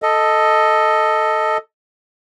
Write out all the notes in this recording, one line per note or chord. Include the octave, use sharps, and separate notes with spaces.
A4 D#5